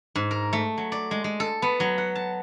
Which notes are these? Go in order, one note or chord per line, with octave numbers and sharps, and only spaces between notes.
G#2
A#4
A3
F#3
D5
G#3
G#3
A4
B3
F#3
F#5
A5